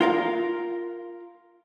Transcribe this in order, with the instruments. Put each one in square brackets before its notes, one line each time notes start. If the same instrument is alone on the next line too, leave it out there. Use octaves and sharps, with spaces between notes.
[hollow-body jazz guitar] F4 A#4 F5